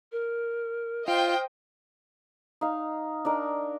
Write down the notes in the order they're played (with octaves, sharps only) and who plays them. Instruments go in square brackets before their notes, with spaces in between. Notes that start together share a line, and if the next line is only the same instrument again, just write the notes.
[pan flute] A#4
[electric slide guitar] F4 [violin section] C5 D#5 G5 [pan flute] F6
[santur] D#4 F5
D4 D#4 A#4